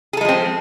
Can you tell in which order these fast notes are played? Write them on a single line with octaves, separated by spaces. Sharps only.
G#4 A4 G#3 F3 C4